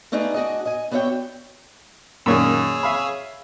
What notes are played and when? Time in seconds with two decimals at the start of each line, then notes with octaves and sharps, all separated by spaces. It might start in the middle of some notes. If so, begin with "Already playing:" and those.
0.12 A3 B3 D4 D#4 G#4
0.34 D4 F#4 G#4 D#5
0.65 D#5 G#5
0.91 B3 D4 F#4 C#5 E5 G5
2.26 F#2 A#2 D#3 G#4 C#5 E6
2.83 E5 F5 B5